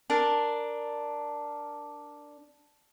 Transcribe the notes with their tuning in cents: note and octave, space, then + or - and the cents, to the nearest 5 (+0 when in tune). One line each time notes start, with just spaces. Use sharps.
D4 +0 A#4 +0